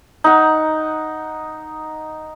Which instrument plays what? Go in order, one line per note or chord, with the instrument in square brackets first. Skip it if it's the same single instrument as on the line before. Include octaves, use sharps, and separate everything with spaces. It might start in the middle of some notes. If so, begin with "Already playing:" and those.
[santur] D#4 F#5